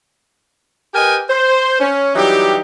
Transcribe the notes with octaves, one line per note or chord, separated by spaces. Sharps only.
G4 A#4 B4 D#5 G5 G#5
C5
C#4
E3 F#3 G3 D#4 G4